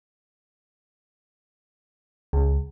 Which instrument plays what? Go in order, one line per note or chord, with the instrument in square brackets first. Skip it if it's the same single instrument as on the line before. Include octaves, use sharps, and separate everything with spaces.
[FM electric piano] C#2